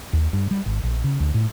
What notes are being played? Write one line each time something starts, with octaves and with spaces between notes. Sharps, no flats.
D#2
G2
G3
G#1
A#1
C#3
D2
A2